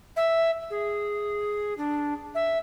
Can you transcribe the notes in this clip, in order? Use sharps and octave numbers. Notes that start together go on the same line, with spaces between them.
E5
G#4
D4
E5